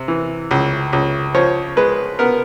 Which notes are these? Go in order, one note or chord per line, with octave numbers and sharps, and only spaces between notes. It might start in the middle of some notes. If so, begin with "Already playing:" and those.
Already playing: C3
E3
C#2
C#2
F3 C#5
G#3 B4
B3 A#4